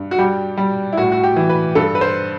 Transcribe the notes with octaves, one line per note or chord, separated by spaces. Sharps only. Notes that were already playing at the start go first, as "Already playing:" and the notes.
Already playing: G2
F#4
G3 G4
G3
E4
A2 F#4
F#4
G4
E3
B4
G2 A4
B4
C5